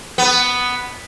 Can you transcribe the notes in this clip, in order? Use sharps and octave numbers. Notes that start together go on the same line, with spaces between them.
B3